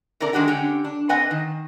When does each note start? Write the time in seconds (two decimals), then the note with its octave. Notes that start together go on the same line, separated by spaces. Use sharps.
0.20 C3 A4 A#4 D5
0.33 D#3 G#3 D4 F#4 G4
0.48 D3 C#4 G4
0.84 D4
1.09 C4 B4 D#5 F#5 G#5
1.31 D#3